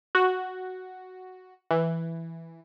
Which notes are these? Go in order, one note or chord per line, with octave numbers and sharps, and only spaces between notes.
F#4
E3